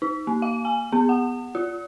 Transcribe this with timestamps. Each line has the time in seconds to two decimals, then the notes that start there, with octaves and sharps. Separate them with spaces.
0.02 D#4
0.27 A#3
0.42 F5
0.65 G#5
0.92 B3
1.09 F#5
1.55 F4